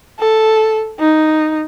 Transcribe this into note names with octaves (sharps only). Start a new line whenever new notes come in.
A4
D#4